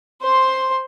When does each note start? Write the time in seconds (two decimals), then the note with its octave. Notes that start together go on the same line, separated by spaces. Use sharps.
0.21 C5 C6